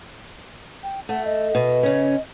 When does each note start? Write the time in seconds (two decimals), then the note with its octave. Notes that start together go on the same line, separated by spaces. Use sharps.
0.83 G5
1.09 A3 F#5
1.25 D#5
1.55 B2
1.83 C#3 C#4